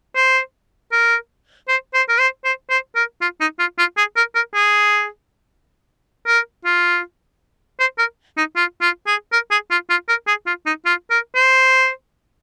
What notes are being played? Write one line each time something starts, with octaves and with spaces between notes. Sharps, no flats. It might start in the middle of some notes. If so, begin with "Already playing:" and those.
C5
A#4
C5
C5
A#4
C5
C5
C5
A#4
F4
D#4
F4
F4
G#4
A#4
A#4
G#4
A#4
F4
C5
A#4
D#4
F4
F4
G#4
A#4
G#4
F4
F4
A#4
G#4
F4
D#4
F4
A#4
C5